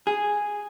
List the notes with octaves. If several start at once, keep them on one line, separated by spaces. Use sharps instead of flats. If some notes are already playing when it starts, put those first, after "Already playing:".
G#4